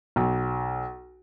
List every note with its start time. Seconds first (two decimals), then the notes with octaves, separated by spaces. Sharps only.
0.16 B1